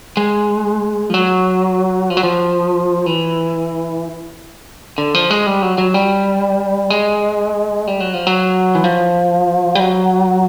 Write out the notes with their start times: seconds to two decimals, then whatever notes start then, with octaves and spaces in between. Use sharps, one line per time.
0.17 G#3
1.10 F3
1.14 F#3
2.10 F3
2.17 F#3
2.23 F3
3.06 E3
4.98 D3
5.14 F3
5.30 G#3
5.47 G3
5.62 F#3
5.78 F#3
5.94 G3
6.90 G#3
7.87 G3
8.00 F#3
8.14 F3
8.27 F#3
8.75 E3
8.84 F3
9.75 G3
9.80 F#3